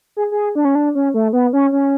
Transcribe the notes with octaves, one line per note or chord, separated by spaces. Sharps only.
G#4
G#4
D4
C#4
D4
C#4
A3
B3
C#4
C#4